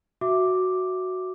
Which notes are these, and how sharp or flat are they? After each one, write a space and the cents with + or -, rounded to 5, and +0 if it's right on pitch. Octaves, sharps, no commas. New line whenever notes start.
F#4 +0 E5 +0 D6 +0